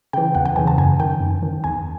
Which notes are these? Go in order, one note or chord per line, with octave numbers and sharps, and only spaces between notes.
C#3 E3 G5
E2 F#5
G5
C#3 E3 G#5
A5
F#2 G#5
D#3 G5
F#2
D#3
E2 G#5